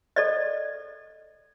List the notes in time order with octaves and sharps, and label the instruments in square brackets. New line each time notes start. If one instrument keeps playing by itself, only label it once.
[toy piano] A4 D5 D#5